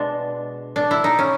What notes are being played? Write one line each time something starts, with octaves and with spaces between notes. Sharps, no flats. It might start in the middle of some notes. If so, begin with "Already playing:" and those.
Already playing: B2 G#3 D4
D4
E4
D#4
C#4